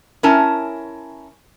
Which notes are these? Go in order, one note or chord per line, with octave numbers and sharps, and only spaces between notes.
C#4 E4 A#4 G#5 A5